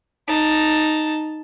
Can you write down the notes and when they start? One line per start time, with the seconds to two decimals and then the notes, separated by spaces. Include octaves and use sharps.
0.28 D#4 A5